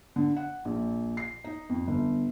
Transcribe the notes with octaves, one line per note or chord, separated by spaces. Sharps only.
D3
F#5
A#1
C7
D#4
F2
G1